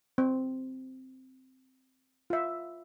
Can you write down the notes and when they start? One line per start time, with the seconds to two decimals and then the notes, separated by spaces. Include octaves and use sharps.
0.18 C4
2.30 F4 E5